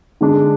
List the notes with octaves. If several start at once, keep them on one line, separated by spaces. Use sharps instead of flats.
D3 G#3 D4